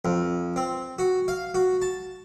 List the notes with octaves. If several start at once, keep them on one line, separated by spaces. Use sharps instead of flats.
F2
C4
F#4
F5
F#4
A5